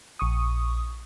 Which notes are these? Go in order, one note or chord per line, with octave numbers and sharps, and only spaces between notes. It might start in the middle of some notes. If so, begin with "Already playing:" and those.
A#1 C#6 D#6